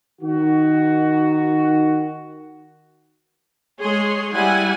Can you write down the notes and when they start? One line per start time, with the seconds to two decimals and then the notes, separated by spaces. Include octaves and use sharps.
0.21 D#3 F#4
3.80 G#3 G#4 C#5 C6
4.33 G3 E4 F#5 G#5